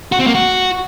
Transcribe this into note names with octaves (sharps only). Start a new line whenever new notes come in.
F#4
C4
A#3
F#4